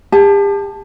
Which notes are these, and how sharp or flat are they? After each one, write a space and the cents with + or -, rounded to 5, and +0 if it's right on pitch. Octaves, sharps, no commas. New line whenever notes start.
G4 +40 A5 +0